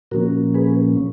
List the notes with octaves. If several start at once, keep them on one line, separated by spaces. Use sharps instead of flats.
A#2 F3 A#3 C#4 F#4 A#4
G#4 B4